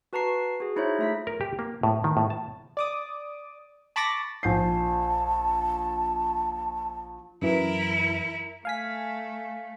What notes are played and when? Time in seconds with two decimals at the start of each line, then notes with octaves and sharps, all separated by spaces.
0.13 F#4 B4 A5 A#5 C#6 C7
0.60 F#4 G#4
0.76 D#4 E4 G#4 C5 C#5 E5
0.99 A3 F4 E5 B5 B6
1.27 A#4
1.41 G4
1.59 A#3
1.83 A2
2.04 D#3
2.17 A2
2.30 A5
2.77 D5 D6 D#6
3.96 A5 B5 C#6 D6 A6 A#6
4.43 A#1 A5 G6 C7
7.42 F#2 E3 E4 A#4
8.65 A3 F5 G#5 B6